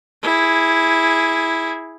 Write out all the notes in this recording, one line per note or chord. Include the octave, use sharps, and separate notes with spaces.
E4 G#4